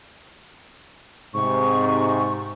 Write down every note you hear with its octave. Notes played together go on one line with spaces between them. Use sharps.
G#2 C3 C#6